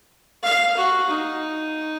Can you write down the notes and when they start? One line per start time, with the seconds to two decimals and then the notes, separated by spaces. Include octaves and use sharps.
0.43 F5
0.77 F#4
1.10 D#4